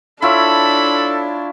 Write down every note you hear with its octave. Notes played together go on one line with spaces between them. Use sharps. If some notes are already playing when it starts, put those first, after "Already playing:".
D4 E4 F4 A4 C#5 B5